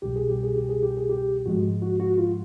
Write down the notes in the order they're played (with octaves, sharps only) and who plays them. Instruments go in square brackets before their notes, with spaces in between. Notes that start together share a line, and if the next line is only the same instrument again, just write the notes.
[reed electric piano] C2 B2 G3 G4
G#4
G4
G#4
G4
G#4
G4
G#4
G4
G#2 F3 G#3 F#4
F#4
F#4
F4